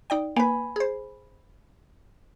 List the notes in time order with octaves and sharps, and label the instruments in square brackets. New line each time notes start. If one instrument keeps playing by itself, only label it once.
[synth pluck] D#4 D5 G5
[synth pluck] A#3 B4 [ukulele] G#5 B5
[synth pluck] G#4 C5